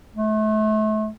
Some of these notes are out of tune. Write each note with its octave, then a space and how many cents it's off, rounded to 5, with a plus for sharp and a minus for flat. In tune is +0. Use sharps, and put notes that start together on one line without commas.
A3 -35